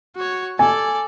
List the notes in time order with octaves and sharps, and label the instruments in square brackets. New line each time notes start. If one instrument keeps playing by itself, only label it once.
[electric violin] F#4 C#5
[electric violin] A4 D5 [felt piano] G#5